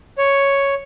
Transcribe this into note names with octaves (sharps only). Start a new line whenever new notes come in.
C#5